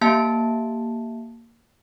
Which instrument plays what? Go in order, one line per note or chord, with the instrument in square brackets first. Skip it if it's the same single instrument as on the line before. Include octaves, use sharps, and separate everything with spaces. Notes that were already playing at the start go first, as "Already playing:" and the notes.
[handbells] A#3 G4 E5 F5 A5